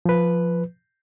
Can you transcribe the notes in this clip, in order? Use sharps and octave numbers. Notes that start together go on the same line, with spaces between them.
F3 B4